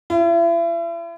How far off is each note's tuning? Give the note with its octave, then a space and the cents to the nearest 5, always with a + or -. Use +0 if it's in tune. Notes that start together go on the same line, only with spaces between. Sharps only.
E4 +40